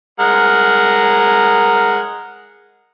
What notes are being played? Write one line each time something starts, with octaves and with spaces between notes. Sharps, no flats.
G#3 A#4 F#5